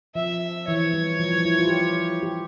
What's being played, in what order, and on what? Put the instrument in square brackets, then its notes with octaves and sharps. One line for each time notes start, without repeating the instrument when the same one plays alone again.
[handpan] F3 [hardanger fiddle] E5
[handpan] E3 [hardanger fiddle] C#5
[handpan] G3
F3
F3
E4
F4
G4
F4
G4